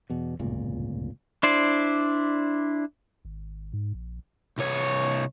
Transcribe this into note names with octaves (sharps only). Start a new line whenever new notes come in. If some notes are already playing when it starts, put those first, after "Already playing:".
E2 B2
D1 G1 C#2 A#2
D4 E4 C5 D5
G#1
G#2
A#1
C2 C#5